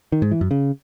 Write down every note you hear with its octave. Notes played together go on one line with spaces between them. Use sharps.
D#3
G#2
E3
F#2
C#3